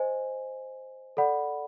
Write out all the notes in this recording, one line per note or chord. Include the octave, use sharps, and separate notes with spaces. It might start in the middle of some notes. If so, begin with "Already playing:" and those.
Already playing: C5 D#5 G#5
A4 D5 F#5 B5